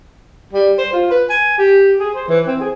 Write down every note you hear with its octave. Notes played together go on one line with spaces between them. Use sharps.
G3
C5
F4
B4
G#5
G4
G#4
C5
E3
C4
G#4